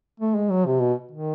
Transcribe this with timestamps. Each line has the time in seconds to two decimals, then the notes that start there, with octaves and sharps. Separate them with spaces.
0.20 A3
0.35 G#3
0.50 F#3
0.66 C3
0.80 B2
1.11 D#3